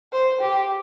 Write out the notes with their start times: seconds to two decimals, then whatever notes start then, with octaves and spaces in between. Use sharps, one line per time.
0.12 C5
0.41 G4